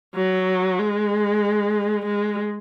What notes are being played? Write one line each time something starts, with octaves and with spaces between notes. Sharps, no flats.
F#3
G#3
G#3